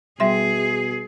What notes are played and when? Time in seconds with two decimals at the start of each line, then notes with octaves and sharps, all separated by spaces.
0.20 B2 G3 G#4 E5 C6